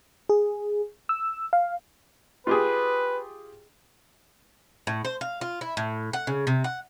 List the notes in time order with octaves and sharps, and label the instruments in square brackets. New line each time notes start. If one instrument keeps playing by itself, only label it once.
[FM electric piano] G#4
E6
F5
[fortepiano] F4 G4 G#4 [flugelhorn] B4
[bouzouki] A2
C5
F5
F4
E4
A2
F#5
C#3
C3
F#5